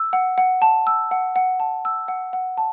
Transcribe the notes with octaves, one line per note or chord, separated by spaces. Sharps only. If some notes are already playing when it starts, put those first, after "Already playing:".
Already playing: E6
F#5
F#5
A5
E6
F#5
F#5
A5
E6
F#5
F#5
A5